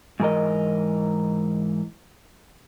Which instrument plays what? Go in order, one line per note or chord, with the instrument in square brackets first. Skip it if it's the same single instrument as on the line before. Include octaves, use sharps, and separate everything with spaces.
[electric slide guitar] G#2 E3 A#4 D#5